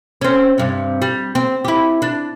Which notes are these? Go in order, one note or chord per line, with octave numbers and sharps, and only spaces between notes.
C4 C#4
G2 C3
G3
C4
E4 G4
D4